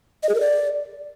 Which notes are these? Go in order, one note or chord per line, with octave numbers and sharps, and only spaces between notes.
D#5
G#4
A#4
D5